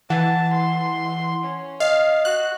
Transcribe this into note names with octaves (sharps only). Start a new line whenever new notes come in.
E3 F#5 A5
C6
C#4
D#5 F5
F#4 F#6